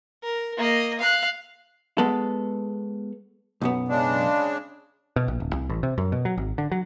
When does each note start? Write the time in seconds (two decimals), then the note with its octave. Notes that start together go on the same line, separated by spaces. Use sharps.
0.23 A#4
0.57 A#3 D#5
0.99 F5 F#6
1.98 G#3 B3 A4
3.61 B1 F#2 B3
3.88 C#3 G#3 D4
5.16 B2
5.28 A#1
5.40 D1
5.53 C2
5.69 A1
5.83 C3
5.98 F#2
6.12 B2
6.25 F#3
6.37 G#1
6.58 D3
6.72 F#3